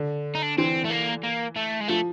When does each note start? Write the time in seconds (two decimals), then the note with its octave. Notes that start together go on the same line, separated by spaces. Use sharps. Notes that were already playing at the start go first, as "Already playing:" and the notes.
Already playing: D3
0.35 D#4
0.43 D4
0.58 E3 C4
0.85 A3
0.91 A#3
1.24 A#3
1.56 A3
1.81 G#3
1.88 F3 A3